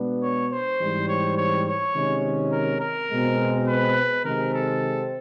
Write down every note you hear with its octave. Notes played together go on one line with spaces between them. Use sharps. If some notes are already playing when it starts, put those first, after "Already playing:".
Already playing: B2 G#3 B3 D4
C#5
C5
G#2 E3 G3 C4
C#5
C#5
C#5
C3 D#3 G#3 C#4
A#4
A#4
B2 G#3 C4
B4
C3 D#3 G#3 C4 A#4
A4